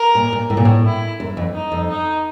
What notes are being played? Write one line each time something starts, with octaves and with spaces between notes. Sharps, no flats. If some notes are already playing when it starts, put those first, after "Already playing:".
Already playing: A#4
A#2
A#2
A2
A#2
A2
E4
F#2
F2
D#4
F2
D#4